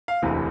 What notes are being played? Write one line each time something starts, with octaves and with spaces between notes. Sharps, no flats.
F5
E1 D2 C3 E3